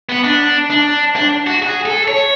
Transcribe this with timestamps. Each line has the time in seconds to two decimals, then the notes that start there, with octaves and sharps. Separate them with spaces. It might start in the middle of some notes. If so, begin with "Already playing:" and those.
0.09 B3
0.24 D4
0.70 D4
1.16 D4
1.47 F#4
1.62 G#4
1.86 A4
2.08 C#5